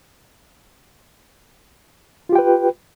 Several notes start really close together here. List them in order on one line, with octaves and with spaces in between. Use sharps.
F4 G4 G5 B4